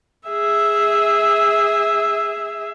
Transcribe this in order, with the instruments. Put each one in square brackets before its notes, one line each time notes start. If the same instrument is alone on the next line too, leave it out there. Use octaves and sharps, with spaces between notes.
[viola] G#4 E5